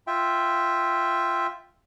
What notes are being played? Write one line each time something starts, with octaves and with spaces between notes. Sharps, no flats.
F4 E5 G5